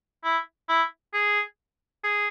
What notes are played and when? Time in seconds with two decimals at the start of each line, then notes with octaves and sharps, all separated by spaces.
0.24 E4
0.69 E4
1.14 G#4
2.04 G#4